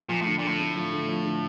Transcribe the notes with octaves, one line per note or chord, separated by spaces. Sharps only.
A#2 F3
A2 D3
A#2
A2 D3
A3
F3
D3
F3
D3